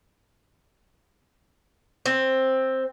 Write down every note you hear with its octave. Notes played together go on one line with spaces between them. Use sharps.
C4